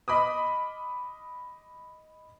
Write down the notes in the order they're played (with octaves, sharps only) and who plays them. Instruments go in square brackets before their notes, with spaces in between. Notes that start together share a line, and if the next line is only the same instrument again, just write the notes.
[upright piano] D#5 B5 D6 D#6